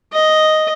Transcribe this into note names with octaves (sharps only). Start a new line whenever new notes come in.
D#5